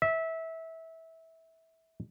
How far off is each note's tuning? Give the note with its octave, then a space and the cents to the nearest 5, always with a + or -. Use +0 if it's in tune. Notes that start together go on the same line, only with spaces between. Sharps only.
E5 -20